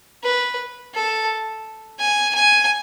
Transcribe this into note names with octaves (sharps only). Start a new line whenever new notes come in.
B4
A4
G#5
G#5